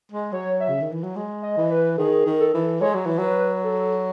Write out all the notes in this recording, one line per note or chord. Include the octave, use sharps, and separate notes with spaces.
G#3
F#3 C#5
E5
C#3
D#3
E3
F#3
G#3
D#5
E3
B4
D#3 G#4
D#3
A4
E3
G#3 C#5
F#3
E3
F#3 B4
A4